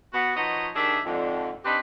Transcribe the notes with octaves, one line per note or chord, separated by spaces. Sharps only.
B3 F#4
F3 D#4 F#4 B4 C#5 D#5
D#3 D4 G4 G#4 E5
F2 G#2 D3
C4 D4 D#4 G4 B4